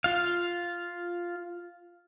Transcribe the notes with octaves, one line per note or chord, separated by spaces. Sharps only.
F4 F5